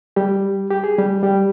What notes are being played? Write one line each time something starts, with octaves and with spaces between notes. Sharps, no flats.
G3 G4
G4
G#4
G3 G4
G3 G4